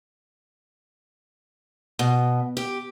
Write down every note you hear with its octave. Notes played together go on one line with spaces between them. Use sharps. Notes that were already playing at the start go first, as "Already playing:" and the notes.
B2
G4